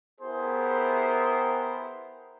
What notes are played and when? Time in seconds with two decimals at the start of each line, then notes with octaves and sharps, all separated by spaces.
0.21 B3 E4 G4 G#4 A#4 C5